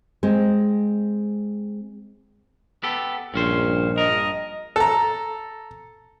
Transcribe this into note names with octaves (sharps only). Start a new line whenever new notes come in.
G#3 C4
B3 G4 A4
A#1 G2 C#4 C5
G2 A#4 D#5
A4 A#5